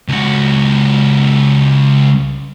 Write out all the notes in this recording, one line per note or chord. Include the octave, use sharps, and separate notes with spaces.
C#2 F#4